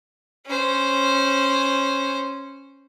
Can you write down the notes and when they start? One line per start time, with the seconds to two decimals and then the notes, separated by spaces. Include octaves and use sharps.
0.47 C#4 C5